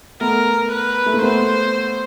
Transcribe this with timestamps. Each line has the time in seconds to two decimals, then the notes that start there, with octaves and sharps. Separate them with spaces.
0.21 A3 B3 A#4
0.72 B4
1.06 A3
1.14 A#3
1.22 A3 B3 C5